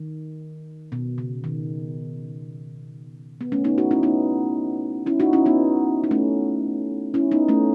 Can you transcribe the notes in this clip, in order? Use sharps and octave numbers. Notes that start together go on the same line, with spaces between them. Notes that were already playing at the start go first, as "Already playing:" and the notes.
Already playing: D#3
B2
C#3
D#3
B3
A3 C#4
B3 D#4
D#4 F#4
C#4 E4
B3 D#4
C#4 E4
D#4 F#4
C#4 E4
B3 D#4
D#4
A3 C#4
C#4 E4
B3 D#4
A3 C#4